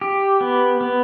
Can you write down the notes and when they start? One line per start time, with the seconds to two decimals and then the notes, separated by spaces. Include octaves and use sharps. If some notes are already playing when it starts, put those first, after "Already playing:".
0.01 G4
0.41 B3
0.81 B3